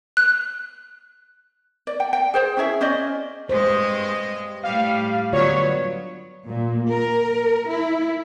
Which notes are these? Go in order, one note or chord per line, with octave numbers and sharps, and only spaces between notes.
F#6
D5
G5
G5
G#4 C5 G5
C#4 E4 G#4 E5
C#4 C5 D5 D#5
G2 G#3 C5 D#5
A2 G3 F5
D3 F#3 B3 F4 C#5 D5
A#2
A#4
E4